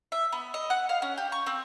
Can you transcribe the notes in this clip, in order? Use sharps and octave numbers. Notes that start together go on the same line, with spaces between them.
E5
B3
D#5
F#5
F5
C#4
G4
C#6
C4